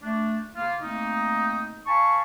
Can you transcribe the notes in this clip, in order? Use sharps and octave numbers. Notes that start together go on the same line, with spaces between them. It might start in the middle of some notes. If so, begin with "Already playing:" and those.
A3 D4
C#3 A#3 F4
A3 A#3 C4 D#4
F5 G#5 A5 B5 C#6